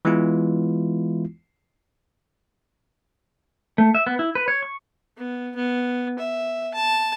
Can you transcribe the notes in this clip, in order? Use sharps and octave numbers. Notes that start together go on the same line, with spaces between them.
E3 G#3 B3 E4 F4
A3
E5
B3
E4
B4
C#5
C#6
B3
B3
E5
A5